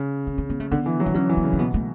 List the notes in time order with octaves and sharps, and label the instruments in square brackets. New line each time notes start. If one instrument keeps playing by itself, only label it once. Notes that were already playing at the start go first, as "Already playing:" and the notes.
Already playing: [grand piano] C#3
[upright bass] C#4
C#4
B3
A3
[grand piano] D3 [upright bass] B3
[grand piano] E3
F#3
[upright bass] D4
[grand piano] F#3 [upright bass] C#4
[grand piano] E3
[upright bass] B3
[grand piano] C#3
[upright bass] C#4
[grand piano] B2 [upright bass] B3
[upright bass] A3